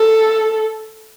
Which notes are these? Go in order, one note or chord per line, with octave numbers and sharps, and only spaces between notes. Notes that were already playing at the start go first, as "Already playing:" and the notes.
Already playing: A4